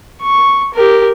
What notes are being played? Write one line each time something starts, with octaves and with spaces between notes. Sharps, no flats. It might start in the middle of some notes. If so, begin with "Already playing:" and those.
C#6
G4 A#4